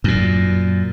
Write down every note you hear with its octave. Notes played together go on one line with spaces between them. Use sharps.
F#2 A#2